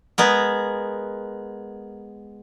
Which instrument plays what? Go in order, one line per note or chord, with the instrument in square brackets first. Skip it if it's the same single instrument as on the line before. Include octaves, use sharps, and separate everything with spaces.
[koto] G#3 B3 A#4